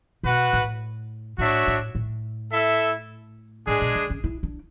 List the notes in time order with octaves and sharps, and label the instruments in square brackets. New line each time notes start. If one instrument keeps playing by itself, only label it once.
[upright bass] B2 [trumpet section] F#4 B4 F#5
[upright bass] A2
[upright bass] A2 [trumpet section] D4 F#4 C#5 E5
[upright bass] A2
A2
[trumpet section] E4 A4 E5
[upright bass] A2 [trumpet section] G#3 D4 G#4
[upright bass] B2
D3
C#4
E4
D4